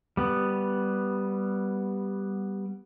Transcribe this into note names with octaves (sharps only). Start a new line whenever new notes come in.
G3 B3